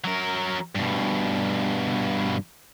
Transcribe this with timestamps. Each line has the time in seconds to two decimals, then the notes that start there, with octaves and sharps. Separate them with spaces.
0.04 F#3 A#4
0.75 G2 B2